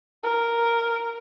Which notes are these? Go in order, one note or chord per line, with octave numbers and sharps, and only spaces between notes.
A#4